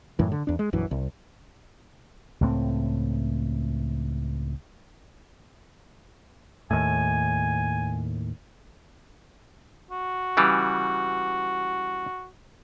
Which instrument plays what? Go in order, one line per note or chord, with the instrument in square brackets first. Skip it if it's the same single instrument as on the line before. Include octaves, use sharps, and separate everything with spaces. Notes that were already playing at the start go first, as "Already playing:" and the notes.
[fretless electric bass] F#2 A2 E3
D3
E2 D4
G#3
A#1 F#2 E3
C2
[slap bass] C#2 A2 C4
[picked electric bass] D#2 A2 [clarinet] G#5
[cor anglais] F#4
[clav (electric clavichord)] C#3 E3 G3